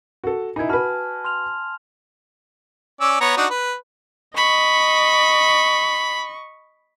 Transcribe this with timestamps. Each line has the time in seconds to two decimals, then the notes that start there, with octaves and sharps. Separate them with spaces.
0.24 F#4 A4
0.56 D#4 E4 G#5 G#6
0.69 F#4 B4 A5 B5 F6
1.24 C6 F6 F7
3.01 C#4 D5 E6
3.20 B3 C#5 A#5
3.37 D4 D#4 F#4
3.50 B4
4.37 D#5 B5 C#6